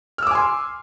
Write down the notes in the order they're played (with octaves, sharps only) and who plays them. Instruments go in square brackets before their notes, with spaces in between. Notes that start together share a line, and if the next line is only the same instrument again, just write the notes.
[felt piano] F6
E6
D6
G#5
C6